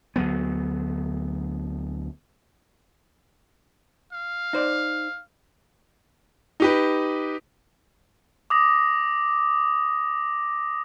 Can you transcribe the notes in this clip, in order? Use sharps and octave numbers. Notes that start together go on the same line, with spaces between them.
D2 F#3 B3
F5
D#4 C5 D5
D#4 G4 B4
D6 D#6 A#6